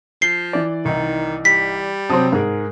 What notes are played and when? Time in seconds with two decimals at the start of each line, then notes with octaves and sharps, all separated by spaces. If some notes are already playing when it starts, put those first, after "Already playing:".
0.22 F3 C7 G7
0.53 E3 D5
0.85 C2 D#3 D#4
1.45 G3 B6
2.09 C3 F#3 C4 A5 D#6
2.32 G#2 G#4 A#4